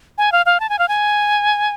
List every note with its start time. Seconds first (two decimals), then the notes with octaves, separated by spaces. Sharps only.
0.18 G#5
0.32 F5
0.46 F5
0.60 A5
0.69 G#5
0.79 F5
0.88 G#5